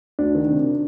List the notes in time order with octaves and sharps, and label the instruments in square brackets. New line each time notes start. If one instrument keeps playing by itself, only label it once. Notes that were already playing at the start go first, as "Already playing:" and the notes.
[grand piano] D2 [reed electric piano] D4
[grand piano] D#3
C3